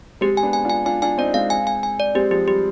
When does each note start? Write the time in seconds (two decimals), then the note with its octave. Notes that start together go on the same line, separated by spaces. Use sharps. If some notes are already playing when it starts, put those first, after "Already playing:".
0.21 G#3 C4 G4
0.37 G#5
0.43 B3 D4
0.53 G#5
0.65 D4 F4
0.70 G#5
0.86 D4 F4 G#5
1.02 D4 F4 G#5
1.18 C4 D#4 D5
1.34 G#3 C4 F5
1.50 G#5
1.67 G#5
1.83 G#5
2.00 D5
2.15 G#3 C4 G4
2.31 F3 G#3 G4
2.48 G3 G4